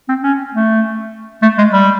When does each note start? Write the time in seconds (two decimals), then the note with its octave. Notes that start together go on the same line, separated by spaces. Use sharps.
0.09 C4
0.23 C#4
0.54 A3
1.42 A3
1.58 G#3
1.72 G3